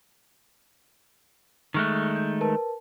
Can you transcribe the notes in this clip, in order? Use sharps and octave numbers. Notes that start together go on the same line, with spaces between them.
D#3 G#3 A3 C#6 F6 F#6
G6
A#4 B4 A5